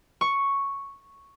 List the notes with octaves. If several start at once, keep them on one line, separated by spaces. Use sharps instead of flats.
C#6